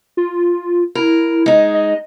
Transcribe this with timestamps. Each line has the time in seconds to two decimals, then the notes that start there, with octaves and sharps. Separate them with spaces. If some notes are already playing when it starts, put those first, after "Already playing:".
0.17 F4
0.95 E4 A#4
1.46 G#3 D#4
1.74 D#5